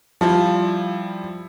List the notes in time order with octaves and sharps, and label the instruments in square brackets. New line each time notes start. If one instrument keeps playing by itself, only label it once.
[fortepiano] F3 [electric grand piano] G3 E4 F4